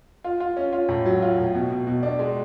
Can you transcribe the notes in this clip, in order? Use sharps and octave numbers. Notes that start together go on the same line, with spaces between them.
F4
F4
C#4
F4
A2
F#3
F4
A2
B2
B2
B2
D4
G#3